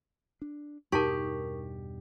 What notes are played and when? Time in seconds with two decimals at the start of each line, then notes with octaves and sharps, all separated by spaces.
0.42 D4
0.92 E2 G2 B2 D#4 G4 A#4 A5 C#6